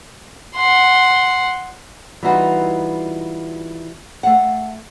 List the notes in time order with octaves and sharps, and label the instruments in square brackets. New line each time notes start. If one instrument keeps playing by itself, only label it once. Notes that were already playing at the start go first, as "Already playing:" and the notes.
[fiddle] F#5 C6
[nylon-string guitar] E3 G3 B3 D#4 F4 F#4
A3 F5 F#5